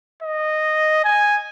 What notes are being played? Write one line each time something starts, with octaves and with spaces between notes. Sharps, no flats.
D#5
G#5